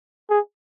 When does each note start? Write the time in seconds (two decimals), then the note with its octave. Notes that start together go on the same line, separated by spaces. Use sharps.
0.30 G#4